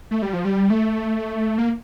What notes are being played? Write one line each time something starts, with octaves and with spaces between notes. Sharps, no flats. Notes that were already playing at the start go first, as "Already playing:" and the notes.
A3
G3
F3
G3
A3
A#3